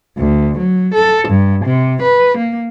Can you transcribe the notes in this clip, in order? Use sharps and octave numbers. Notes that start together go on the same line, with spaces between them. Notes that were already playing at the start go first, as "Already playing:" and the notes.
D2
F#3
A4
G2
C3
B4
A#3